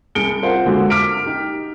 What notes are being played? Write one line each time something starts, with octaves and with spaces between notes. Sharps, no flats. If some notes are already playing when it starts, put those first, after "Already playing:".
C2 G#4 C#7 D7 G7
F4 A#4 C5 F5 F#5
D3 F#3 G#3
D6 F6 B6 D7
D#4 G4